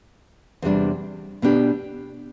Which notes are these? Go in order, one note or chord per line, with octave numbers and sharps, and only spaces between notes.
E2 C3 G3 D4
B2 B3 D4 G4